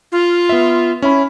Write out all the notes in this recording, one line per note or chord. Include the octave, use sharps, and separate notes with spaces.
F4
B3 E5
C#4 E4 B5